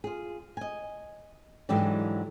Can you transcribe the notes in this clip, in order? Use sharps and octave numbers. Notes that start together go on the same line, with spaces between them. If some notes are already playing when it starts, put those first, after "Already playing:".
F4 G#4
D#5 G#5
G#2 D3 E3 F#3 G4 D5